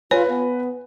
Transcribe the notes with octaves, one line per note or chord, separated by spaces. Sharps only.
F4 B4 C#5 G#5
B3